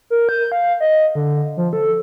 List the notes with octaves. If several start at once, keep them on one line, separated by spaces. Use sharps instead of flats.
A#4
G6
F5
D#5
D3
F3
A4